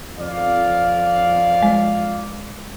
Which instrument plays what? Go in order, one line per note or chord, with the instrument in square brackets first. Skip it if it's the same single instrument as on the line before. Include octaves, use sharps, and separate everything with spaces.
[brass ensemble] F2 D5 F5
[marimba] G#3